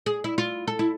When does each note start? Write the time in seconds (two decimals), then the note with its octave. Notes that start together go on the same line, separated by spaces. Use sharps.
0.06 G#4
0.24 E4
0.38 F4
0.68 A4
0.79 E4